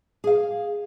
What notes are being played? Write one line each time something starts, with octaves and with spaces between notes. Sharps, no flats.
G#4 F5